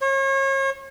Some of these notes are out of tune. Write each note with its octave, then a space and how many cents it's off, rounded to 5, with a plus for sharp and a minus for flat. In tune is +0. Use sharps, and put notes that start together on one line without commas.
C#5 -35